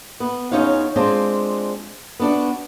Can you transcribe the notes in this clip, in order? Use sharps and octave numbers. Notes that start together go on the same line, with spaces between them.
B3
E2 C#4 D#4 F4 C#5 F5
G#3 C4 D4 F4
B3 D4 F#4